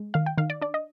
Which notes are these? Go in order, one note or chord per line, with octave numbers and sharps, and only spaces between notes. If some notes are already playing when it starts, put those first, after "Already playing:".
Already playing: G#3
D#3 F5
G5
D#3 F5
D5
D4 D5
D#5